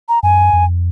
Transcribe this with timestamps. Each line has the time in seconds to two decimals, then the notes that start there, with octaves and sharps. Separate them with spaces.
0.09 A#5
0.23 F#2 G#5
0.53 F2